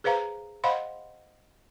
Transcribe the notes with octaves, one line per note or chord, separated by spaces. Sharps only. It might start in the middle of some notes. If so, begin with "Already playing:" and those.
G#4 B4 C5 F5 A#5
C5 D#5 F5 F#5 B5 C6